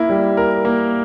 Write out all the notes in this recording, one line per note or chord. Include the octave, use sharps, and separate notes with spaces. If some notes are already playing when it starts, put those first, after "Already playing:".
Already playing: A#3 E4
G3
A#4
A#3